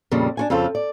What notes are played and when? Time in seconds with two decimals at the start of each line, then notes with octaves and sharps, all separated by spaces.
0.11 F2 A#2 C#3 G3
0.37 D4 F#4 G#5
0.50 F2 C#3 C4 F4 A4
0.75 D5